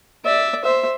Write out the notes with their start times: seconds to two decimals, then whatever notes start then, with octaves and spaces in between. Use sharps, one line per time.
0.25 D5 E5
0.65 C5 E5